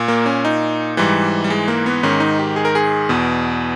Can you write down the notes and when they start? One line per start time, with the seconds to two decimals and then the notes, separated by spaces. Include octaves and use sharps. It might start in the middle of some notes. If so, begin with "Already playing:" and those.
Already playing: A#2
0.08 A#3
0.26 C#4
0.45 D#4
0.97 G#2 E3 G3
1.44 G3
1.50 G#3
1.68 A#3
1.86 B3
2.03 G#2 D#3 C#4
2.20 D#4
2.39 G4
2.56 G#4
2.65 A#4
2.75 G#4
3.09 E2 B2